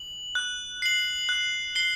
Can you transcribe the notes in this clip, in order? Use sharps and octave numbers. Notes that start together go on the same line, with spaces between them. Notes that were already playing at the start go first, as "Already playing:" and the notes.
Already playing: F#7
F#6
C7 F#7
F#6
C7 G7